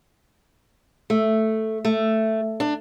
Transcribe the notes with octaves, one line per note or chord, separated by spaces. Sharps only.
A3
A3
D4